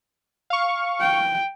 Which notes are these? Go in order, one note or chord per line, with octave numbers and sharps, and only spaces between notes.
F5 C#6
G5